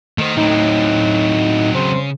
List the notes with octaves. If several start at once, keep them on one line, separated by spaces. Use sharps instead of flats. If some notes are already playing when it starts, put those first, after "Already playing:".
D#3 A3 C5
A2 F#3 C4 D#4
C#3 C5